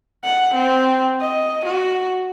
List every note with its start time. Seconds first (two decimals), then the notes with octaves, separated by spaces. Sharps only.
0.24 F#5
0.55 C4
1.21 D#5
1.66 F#4